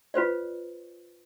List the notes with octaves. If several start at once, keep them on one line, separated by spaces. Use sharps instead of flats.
F4 B4 C5 D5